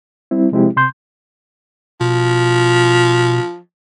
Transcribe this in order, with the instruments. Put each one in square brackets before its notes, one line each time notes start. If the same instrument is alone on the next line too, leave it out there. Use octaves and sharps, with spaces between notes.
[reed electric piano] G3 C4 E4
C3 F3 G#3 C4 E4 G4
C3 C6 G6
[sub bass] B2 [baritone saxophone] F3